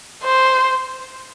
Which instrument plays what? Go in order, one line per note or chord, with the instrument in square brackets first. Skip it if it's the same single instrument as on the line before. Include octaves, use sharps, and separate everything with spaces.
[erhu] C5